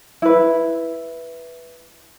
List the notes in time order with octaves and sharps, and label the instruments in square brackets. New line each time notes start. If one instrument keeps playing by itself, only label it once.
[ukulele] E4 B4